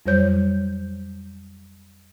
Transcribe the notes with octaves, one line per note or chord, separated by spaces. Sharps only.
F2 F#3 G3 C5 C#5 G6